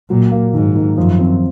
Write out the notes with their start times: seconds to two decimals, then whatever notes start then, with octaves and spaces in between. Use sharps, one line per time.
0.10 A#2 F#3
0.32 A#3
0.53 G#2 D#3
0.76 D#3
0.97 F#2 F3
1.19 C4